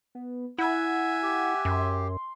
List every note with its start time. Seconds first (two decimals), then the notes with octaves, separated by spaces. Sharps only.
0.15 B3
0.58 E4 E5 F#5 G#5
1.23 G4
1.65 F#2 C6